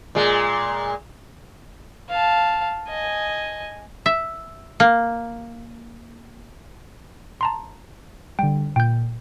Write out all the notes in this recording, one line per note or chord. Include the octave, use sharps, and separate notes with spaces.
A#2 G#3
F5 A5
D#5 G#5
E5
A#3
A5 A#5 C6
D3 G3 G5
A#2 G5 G6